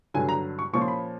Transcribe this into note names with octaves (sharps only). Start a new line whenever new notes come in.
G2 D3 F#3 G#5
A#5
C#6
A#2 F3 A#3 C#4 C#6
C6
B5